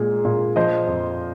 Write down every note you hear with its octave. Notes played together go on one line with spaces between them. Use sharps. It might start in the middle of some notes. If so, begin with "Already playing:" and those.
Already playing: A#2 G#3 G#4
A#2
F3 C5 D#5
F2